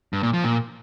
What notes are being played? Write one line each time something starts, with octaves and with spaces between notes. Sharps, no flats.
G2
A#2
F3
A#2